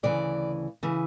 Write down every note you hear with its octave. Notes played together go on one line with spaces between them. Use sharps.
D2 C#3 E3 D5
C#3 E3